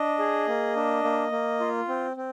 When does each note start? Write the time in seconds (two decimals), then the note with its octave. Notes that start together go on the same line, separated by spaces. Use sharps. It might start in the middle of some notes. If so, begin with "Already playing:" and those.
Already playing: D4 D#5
0.19 G#4
0.48 A#3
0.76 D4
1.04 A#3
1.32 A#3
1.60 F4
1.88 C4
2.17 C4